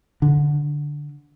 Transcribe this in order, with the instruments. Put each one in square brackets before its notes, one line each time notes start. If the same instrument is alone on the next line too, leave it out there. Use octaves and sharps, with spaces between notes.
[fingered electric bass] D3